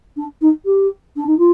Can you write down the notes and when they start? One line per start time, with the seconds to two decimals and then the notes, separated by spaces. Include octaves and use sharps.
0.16 D4
0.41 D#4
0.65 G4
1.16 D4
1.27 D#4
1.38 F4